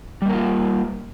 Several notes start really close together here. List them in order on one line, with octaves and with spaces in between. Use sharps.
G3 A#3 A#4 F4